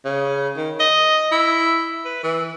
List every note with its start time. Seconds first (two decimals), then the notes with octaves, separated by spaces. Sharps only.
0.05 C#3
0.56 D#3
0.80 D#5
1.32 E4
2.05 B4
2.23 E3